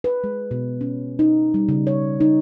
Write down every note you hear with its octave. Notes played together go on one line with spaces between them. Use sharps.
B4
G#3
B2
C#4
D#4
G3
C#3
C#5
D#4